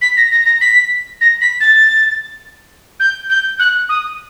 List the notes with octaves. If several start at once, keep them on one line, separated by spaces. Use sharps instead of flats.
B6
A#6
A#6
A#6
B6
A#6
B6
A6
G6
G6
F#6
D#6